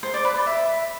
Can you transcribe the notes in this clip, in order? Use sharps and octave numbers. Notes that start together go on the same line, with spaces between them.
C5
D5
B4
D5
E5